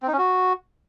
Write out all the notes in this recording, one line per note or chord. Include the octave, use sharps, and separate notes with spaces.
C4
D#4
C#4
F#4